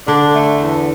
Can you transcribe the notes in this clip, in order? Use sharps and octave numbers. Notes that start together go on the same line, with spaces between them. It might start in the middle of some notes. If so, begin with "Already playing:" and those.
D3 D4
A3
E2